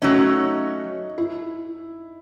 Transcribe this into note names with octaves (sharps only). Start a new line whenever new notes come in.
F#3 A3 C#4 D#4
E4